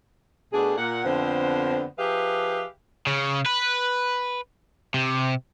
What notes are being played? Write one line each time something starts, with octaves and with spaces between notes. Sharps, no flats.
B2 A3 D4 G#4
A#2 F#5
F2 D3 B3 C4 C5
F3 G4 G#4 B4 E5 F5
C#3
B4
C3